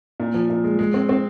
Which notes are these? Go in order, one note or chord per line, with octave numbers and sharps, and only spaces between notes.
A#2
F3
A#2
G#3
G#3
C4
C4